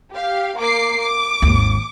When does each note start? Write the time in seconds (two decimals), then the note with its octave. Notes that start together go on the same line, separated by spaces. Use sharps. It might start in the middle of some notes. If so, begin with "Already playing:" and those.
0.12 G4 F5
0.58 A#3 D6 C7
1.00 D6
1.42 G#1 D#2